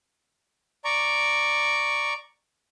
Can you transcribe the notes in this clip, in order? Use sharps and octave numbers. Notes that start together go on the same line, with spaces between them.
D5 A#5 C#6